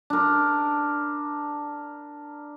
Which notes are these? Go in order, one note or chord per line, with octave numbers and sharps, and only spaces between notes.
D4 A#4